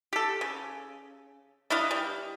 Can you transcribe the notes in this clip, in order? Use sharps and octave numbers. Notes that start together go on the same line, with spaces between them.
G4 A4
C#3
D4 E4 D#5 F5
G3